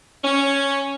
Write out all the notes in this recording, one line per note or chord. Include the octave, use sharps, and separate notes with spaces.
C#4